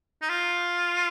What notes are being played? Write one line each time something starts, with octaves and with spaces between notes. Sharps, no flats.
D#4
F4